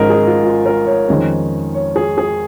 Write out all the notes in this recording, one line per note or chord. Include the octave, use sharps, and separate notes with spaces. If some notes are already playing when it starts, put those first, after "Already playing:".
Already playing: G#1 G#2 F3 G#3 C#4 A#4 D#5
G#4
F4
F4
A#4
C#5
F2 D#3 G#3 C#4
C#5
G#4
G#4